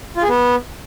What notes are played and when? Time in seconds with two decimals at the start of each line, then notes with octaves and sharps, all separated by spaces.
0.17 F4
0.23 G#4
0.28 B3